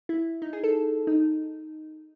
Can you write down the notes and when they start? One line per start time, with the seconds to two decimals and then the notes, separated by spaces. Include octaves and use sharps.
0.09 E4
0.42 D#4
0.53 G#4
0.64 A4
1.07 D#4